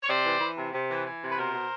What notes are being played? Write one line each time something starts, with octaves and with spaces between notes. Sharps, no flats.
C#5
C3 C5 D5
E3
E3
C3
C3
E3
E3
C3
B4
B2 A#4 C5
B2